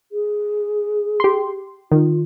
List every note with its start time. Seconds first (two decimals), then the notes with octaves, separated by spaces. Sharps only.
0.12 G#4
1.20 G4 C6
1.92 D#3 F4